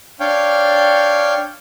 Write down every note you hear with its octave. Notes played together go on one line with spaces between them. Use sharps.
D4 C#5 F5 G5